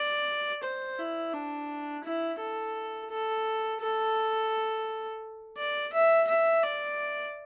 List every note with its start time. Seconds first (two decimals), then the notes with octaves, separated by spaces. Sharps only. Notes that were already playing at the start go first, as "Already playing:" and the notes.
Already playing: D5
0.63 C5
0.98 E4
1.33 D4
2.04 E4
2.40 A4
3.10 A4
3.80 A4
5.57 D5
5.93 E5
6.27 E5
6.63 D5